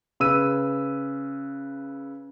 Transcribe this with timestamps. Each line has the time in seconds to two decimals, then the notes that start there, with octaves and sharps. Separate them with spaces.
0.20 C#3 B4 E6 D#7